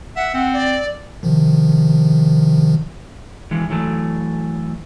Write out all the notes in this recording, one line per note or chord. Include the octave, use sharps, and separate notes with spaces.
E5 F#5
C4
D5
C3 D#3 F3
E3 G#3
E3 F#3 A3